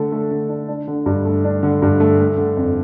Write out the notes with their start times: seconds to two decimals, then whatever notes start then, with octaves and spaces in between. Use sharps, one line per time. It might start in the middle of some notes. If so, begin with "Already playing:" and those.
Already playing: D3 A3 D4 A4
0.12 A3
0.31 D3
0.49 D4
0.68 D4
0.87 D3
1.06 G2
1.25 A3
1.44 D4
1.63 D3
1.82 G2
2.00 A3
2.19 A3
2.38 D3
2.57 F2